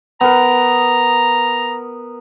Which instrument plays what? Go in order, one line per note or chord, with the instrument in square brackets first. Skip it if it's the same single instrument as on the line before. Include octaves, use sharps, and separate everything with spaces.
[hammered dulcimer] B3 A#4 [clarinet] A#5